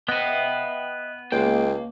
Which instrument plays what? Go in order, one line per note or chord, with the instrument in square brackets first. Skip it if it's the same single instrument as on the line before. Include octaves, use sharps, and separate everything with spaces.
[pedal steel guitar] B3 B4 [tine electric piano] D#5 [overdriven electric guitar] E5 G5
[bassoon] C#2 [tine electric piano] G#3 G5 [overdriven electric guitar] A#3